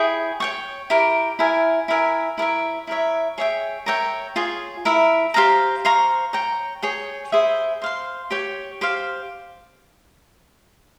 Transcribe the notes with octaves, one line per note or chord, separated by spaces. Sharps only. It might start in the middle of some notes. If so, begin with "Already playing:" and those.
Already playing: E4 G#4 C#5 G5
C#5 G5 C#6
E4 G4 A#4
E4 A#4 E5 G#5
E4 A#4 E5 G#5
E4 A#4 C#5 E5
E4 A#4 C#5 E5
G#4 C#5 E5 G5
A#4 C#5 E5 G5
F4 G#4 C#5
E4 A#4 E5
G4 C5 F5 A#5
C5 F5 A#5 C#6
C#5 G5 A#5
G#4 C#5 G5
E4 G#4 C5 E5
C5 F5 C6
G4 C#5 G5
G4 C5 F5